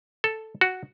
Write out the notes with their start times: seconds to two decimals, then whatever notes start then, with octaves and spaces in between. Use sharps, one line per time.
0.24 A4
0.61 F#4